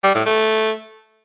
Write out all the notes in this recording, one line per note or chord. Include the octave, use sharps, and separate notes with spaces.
G3
A2
A3